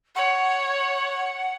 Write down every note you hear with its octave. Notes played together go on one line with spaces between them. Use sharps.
C#5 F#5